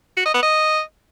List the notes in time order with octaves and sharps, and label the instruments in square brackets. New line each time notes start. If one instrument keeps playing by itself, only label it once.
[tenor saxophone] F#4
D#5
B3
D#5